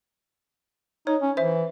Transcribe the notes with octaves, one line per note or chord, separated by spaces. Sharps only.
D#4 C#5
C#4
E3 C5 E5